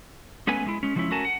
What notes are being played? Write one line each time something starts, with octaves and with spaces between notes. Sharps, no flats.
G#3 A3 B3 C#4 B4 G#5
A2 G#3 E4
G#3 C#4
D3 F3 G#3 A#3 C#4 E4
A3 C#4 F#4 A#4 G#5 A5
F#5